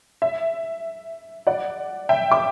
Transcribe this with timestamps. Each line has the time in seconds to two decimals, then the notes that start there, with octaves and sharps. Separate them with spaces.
0.22 E5
1.47 D5 F#5
2.09 E5 G5
2.31 D6